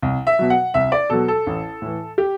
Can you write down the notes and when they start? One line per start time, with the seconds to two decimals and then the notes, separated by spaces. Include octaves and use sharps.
0.02 C2
0.27 E5
0.39 B2 F#3
0.50 F#5
0.74 C2 E5
0.92 D5
1.10 B2 F#3 A4
1.28 A4
1.47 A1
1.82 A2 E3
2.18 G4